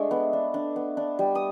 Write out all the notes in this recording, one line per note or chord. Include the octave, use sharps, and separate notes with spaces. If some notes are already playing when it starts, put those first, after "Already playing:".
Already playing: G#3 A3 D4
B3
D4
D4
B3
D4
G3
D#6